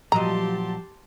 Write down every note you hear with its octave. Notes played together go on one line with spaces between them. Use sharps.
A#2 F3 F#3 G4 D#5 A5 A#5 C6